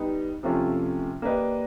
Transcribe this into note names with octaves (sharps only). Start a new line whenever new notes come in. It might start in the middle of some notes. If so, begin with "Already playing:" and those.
Already playing: G3 B3 D#4
C3 F3 A3 C#4 F4
A#3 D4 G4 B4 D#5